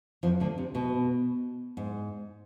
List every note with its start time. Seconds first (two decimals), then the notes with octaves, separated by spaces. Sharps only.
0.23 F2 F3
0.40 D2 D3
0.58 C3
0.75 B2
1.77 G#2